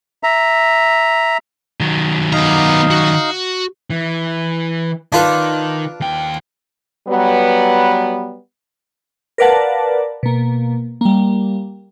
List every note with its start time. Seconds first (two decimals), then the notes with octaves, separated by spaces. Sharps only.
0.23 E5 A#5
1.80 D#3 F#3
2.32 B3 D#4 F5 A#5
2.90 F#4
3.90 E3
5.12 D#3 D4 F4 B4
6.00 D#2 G5
7.08 F#3 G3 B3
9.38 A#4 B4 D5 F5 F#5 A5
10.23 B2 A#3
11.01 G3 A#3